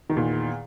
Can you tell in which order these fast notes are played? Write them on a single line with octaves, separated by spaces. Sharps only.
D#3 E2 A#2